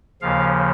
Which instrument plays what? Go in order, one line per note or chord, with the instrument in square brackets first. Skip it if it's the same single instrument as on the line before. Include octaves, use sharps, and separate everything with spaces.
[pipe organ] D#2 C#3 F3 F5